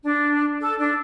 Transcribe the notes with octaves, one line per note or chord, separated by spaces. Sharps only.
D4
A4
D4